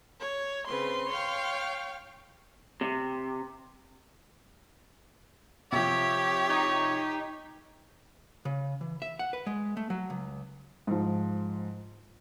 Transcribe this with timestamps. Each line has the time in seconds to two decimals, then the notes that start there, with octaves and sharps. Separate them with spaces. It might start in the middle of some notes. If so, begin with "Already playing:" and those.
0.20 C#5
0.67 C#3 C4 B4 C6
1.09 C#5 F5 G5
2.81 C3
5.72 C3 F3 G4 C#5
6.49 D#4 C#5
8.45 C#3
8.81 E3
9.02 E5
9.19 F#5
9.33 B4
9.47 G#3
9.77 A3
9.90 F#3
10.10 C#2
10.87 G#2 F3